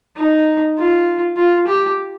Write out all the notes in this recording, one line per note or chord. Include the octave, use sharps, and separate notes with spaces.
D#4
F4
F4
G4